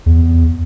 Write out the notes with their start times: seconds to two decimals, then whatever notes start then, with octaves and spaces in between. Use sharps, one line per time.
0.06 E2